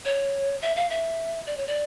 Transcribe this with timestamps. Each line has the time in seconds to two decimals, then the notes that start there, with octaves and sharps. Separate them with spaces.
0.05 C#5
0.62 E5
0.76 F5
0.90 E5
1.47 D5
1.57 C#5
1.67 D5